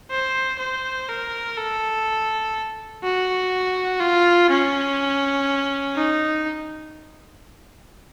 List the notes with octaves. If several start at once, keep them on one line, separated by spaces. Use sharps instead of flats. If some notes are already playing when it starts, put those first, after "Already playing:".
C5
C5
A#4
A4
F#4
F4
C#4
D#4